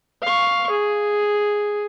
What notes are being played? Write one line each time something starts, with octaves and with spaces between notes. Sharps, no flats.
F5 C#6
G#4